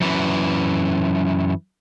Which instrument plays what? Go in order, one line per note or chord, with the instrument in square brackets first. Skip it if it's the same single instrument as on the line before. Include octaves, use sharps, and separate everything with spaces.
[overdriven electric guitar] F#2 E3